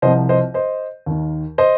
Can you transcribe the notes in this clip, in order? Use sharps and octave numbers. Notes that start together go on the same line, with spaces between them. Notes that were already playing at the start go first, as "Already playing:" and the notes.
C2 C3 F3 C5 D#5
C5 D#5
C5 D#5
D#2 D#3
C5 D#5